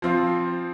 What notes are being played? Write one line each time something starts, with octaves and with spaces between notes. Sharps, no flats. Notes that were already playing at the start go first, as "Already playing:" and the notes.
F3 C4 F4